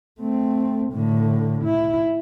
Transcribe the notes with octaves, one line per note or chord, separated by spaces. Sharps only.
A3 C4
A2 D3
E4